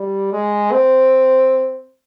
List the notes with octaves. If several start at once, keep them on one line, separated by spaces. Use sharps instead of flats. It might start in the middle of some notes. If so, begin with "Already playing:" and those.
Already playing: G3
G#3
C4